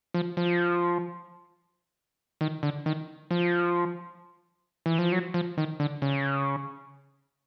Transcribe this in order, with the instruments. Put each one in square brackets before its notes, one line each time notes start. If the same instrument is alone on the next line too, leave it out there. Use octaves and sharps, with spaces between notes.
[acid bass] F3
F3
D#3
D3
D#3
F3
E3
F3
F#3
F3
D#3
D3
C#3